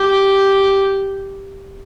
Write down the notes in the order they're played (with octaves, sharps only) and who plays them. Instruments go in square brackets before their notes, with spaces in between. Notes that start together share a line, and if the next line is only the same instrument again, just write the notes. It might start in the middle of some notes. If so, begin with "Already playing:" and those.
Already playing: [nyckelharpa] G4